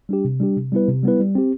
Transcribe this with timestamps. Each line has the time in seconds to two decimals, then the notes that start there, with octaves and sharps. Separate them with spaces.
0.09 G3 D4 G4
0.25 C3
0.40 G3 D4 G4
0.57 C3
0.72 G3 B3 E4 B4
0.88 C3
1.03 G3 B3 E4 B4
1.20 G3
1.35 C4 G4